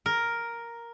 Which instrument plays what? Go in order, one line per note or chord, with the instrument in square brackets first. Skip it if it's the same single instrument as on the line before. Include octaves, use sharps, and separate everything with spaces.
[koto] A#4